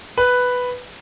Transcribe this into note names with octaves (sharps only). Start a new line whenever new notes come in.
B4